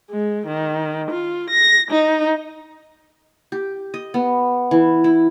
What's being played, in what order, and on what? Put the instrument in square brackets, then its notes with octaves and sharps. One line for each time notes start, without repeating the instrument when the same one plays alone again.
[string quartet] G#3
D#3
F4
A#6
D#4
[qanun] G4
D#5
B3
E3
E4